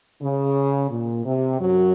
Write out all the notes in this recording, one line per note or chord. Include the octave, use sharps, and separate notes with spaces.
C#3
A#2
C3
F#2 F#3